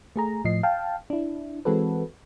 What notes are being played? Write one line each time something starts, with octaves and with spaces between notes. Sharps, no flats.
A3 G#4 A#5
A2 F3 D#5 C7
F5 G5 A5
D4 E4
E3 G#3 C4 F#4 A4 B4